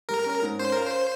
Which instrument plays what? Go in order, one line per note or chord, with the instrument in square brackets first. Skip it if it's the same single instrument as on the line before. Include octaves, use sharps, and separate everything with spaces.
[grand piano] G3 [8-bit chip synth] A#4
[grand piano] C#4
G#2
[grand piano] C#4 [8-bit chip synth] C5
[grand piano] F4 [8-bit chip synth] A#4
[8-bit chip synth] C5